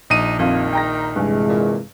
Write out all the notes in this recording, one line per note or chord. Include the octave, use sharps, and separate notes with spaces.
A#1 D#4 D#7
F2 D#3 F4
G5 A#5 A#6
G2 C3 E3 G#3 G#5
A#2